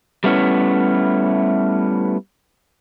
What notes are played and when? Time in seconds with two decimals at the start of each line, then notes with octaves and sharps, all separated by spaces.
0.24 G3 A3 B3 C#4 E4